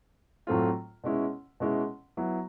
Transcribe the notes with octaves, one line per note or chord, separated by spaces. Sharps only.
A2 F#3 A3 C4 F4
B2 G#3 C#4 E4
B2 G#3 C#4 E4
F#3 B3 E4